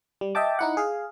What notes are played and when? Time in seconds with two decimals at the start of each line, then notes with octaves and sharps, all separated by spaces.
0.21 G3
0.35 D#5 E5 G5 A5 D6
0.59 D#4 E4 F#5
0.77 G#4 F5